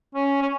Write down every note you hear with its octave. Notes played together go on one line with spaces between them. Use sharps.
C#4
C#4